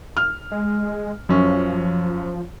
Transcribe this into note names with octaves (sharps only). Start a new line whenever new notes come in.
F6
G#3
F#2 F3 C#4